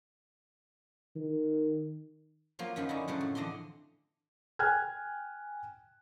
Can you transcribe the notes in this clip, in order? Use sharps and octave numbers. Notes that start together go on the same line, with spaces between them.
D#3
F3 F#3 A#3 F4
F#2 D#3 F3 F5 B5
D3 C#4 D#4 E4
A2 C#3 F#3 C5 F#5 A5
F2
D3 E3 D4 D#5 C6
G5 G#5 F6 F#6 G#6